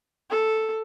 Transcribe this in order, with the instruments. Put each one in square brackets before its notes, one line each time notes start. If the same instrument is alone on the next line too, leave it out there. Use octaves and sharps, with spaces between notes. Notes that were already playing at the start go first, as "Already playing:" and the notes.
[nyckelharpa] A4